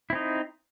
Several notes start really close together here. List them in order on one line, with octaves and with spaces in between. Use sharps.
E4 C4 D#4